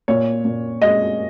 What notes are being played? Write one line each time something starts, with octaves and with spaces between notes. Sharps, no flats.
A#2 C#5
A#2
G#3 D#5